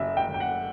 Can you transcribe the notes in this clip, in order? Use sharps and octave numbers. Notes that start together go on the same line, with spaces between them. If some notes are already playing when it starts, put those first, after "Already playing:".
Already playing: F#1 F#2 E5
G5
F#1
G5
F#5